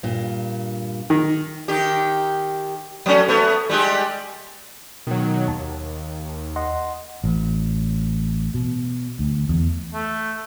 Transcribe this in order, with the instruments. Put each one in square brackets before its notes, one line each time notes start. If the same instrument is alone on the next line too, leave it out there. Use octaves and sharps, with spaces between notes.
[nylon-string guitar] G2 A#2
[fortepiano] D#3
[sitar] D#3 G4
F#3 A3 C#4
A3 B3
G3 G#3 G4
[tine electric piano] B2 [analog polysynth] D#3 F#3
[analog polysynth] D#2 [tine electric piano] A5
[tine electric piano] D#5 F#5 C6
[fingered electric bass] A1
B2
D2
E2
[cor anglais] A3